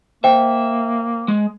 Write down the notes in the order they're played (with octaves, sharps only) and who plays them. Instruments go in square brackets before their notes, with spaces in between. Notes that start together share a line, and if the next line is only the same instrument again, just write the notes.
[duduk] A#3 [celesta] C5 G5 [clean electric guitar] E5
[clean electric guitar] G#3